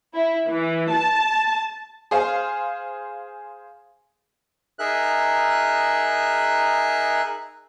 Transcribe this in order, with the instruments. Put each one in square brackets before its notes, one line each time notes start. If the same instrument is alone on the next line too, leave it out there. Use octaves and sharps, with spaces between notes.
[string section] E4
E3
A5
[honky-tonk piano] G#4 C5 F5
[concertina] D#4 G#4 A#4 E5 F#6